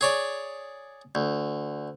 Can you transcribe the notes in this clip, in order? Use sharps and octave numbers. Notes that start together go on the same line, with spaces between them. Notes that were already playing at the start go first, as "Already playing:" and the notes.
G#4 C#5 D5
D2